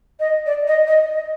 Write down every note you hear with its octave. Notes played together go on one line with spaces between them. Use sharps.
D#5
D5
D#5
D#5